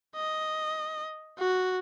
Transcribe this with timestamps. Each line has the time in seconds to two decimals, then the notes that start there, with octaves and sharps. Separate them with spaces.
0.16 D#5
1.39 F#4